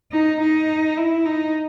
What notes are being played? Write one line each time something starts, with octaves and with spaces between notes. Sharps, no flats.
D#4
D#4
E4
D#4